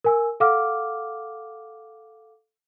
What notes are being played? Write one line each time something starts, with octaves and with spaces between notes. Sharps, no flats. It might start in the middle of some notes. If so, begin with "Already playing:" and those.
A#4 G#5 E6
A4 F5 F#5 D6 F6